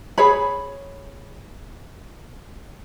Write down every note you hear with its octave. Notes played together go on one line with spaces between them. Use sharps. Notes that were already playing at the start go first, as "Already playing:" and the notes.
G#4 C#5 B5